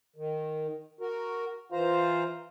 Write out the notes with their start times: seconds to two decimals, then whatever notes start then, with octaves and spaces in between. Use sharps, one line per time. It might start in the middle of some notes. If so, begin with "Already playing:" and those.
0.16 D#3
1.00 F#4 A#4
1.72 E3 F4 C5 A#5